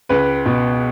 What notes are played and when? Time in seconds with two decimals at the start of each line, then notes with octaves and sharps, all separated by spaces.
0.09 C#2 B4
0.46 B2